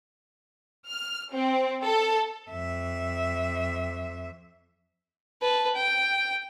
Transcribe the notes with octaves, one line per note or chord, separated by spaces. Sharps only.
F6
C4
A4
F2 E5
B4 A5
G5